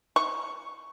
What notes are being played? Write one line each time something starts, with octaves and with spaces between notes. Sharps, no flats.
C#6